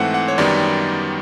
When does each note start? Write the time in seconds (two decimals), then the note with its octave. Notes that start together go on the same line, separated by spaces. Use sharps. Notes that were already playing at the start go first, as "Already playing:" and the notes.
Already playing: G#2 E3 A3 C4 F#5
0.14 F#5
0.28 C#5
0.38 F#2 D#3 G3 B3 D5